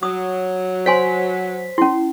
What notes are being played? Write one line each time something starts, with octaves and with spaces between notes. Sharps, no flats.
F#3 D#6
C5 C#5 G#5 C6 B6
C#4 E4 C6